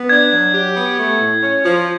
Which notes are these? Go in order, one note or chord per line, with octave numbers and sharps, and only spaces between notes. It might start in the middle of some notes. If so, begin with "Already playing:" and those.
Already playing: B3
D4 G#6
F#3
G4
B3
A3
A2
C#4
F3